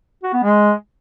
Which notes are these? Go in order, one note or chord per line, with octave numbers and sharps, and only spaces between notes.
F#4
B3
G#3